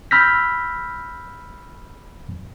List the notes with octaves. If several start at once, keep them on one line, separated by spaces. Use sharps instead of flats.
B5 E6 F6 G6 A#6 B6